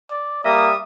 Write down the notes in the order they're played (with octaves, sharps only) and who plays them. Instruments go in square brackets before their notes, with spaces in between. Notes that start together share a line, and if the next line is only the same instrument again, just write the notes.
[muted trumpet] D5
[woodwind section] G3 E5 D#6 [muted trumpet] A#3